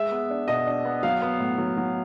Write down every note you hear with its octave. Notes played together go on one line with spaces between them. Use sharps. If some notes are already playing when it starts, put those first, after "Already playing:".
Already playing: G#3 E5
B3
D4
B2 D#5
D4
B3
F#3 F5
B3
A2
F#3
F#3